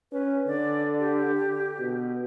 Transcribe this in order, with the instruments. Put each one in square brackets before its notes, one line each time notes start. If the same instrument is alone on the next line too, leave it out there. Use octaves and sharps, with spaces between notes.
[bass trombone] C#4 [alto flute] B4
[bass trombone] D3 [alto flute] D5
[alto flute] G4
[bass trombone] B2